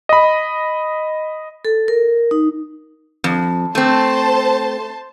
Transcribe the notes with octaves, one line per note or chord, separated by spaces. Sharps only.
D#5 B5
A4
A#4
D#4
F2
A3 C4 C5 A5